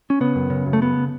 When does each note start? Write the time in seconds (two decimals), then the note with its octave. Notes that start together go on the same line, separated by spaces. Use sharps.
0.10 C#4
0.20 C#3 B3
0.36 F#2
0.50 C#3
0.66 F#2
0.73 A3
0.81 C#3 B3